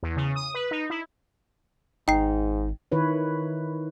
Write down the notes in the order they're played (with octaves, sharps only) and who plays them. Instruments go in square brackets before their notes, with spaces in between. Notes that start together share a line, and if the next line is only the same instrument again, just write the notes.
[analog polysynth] E2
C#3
D#6
B4
D#4
E4
[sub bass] G#1 [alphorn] G#2 [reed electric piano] D#4 [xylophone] G5 C7
[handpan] D#3 E4 B4 C#5